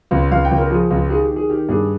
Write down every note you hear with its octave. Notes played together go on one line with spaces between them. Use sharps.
C#2
C#2 F5
G5
C#2
A#4
F3 G#4
C#2
D#3 G#4
G4
D#3
G#4
D#3 G4
G2 G#4